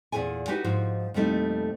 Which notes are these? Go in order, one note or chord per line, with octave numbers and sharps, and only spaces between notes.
E2 A#2 C#3 F4 G#4 G#5
D#4 F#4 G4 B4
G#2 F3 D#4 F#4
F2 B2 G3 A3 A#3 D#4